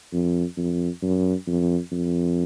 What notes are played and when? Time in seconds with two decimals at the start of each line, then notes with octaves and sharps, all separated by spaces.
0.13 F2
0.57 F2
1.02 F#2
1.47 F2
1.92 F2